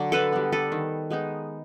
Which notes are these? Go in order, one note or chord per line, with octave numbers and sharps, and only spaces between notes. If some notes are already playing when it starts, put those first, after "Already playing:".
Already playing: D3 F#3 D4
A4 B4
G3 B3
A4 B4
D#3
G#3 B3 D#4